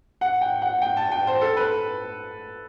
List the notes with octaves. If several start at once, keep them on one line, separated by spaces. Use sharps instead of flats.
F#5
G5
F#5
G5
A5
G5
C5
A4
B4